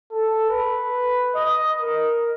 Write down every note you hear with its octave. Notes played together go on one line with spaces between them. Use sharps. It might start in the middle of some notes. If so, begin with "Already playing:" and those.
A4
B4
D#5
A#4